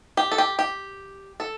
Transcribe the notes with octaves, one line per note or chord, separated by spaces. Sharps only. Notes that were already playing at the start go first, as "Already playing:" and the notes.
G4
A4
G4
G4
A4